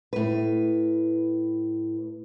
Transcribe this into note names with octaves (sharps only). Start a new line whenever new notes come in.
A2 B4